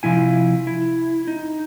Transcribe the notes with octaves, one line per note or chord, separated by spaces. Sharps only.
C3 F3 E4 G#5
E4
D#4